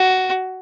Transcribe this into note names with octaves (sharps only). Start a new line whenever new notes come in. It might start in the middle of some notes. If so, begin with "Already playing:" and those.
Already playing: F#4